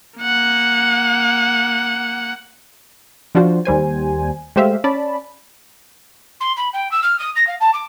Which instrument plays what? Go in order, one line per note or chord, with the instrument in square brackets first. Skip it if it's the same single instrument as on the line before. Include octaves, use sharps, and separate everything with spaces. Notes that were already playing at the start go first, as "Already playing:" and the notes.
[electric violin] A#3 F#5
[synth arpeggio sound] F3 D4 F4 F#4 C5
D#2 G3 C5 G#5
G#3 A3 G4 C5 E5 F5
C#4 D5 A5 B5
[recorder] C6
B5
G5
E6
F6
D#6
A#6
F5
A5
D6